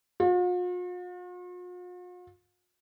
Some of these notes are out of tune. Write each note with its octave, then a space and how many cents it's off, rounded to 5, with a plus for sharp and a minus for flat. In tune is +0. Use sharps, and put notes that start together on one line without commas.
F4 +45